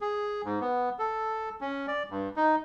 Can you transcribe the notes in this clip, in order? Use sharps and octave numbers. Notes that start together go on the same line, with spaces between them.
G#4
G#2
B3
A4
C#4
D5
G2
D#4